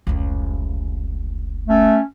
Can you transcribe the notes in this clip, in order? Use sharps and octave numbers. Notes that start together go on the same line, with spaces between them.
F1 C#2
A3 C#4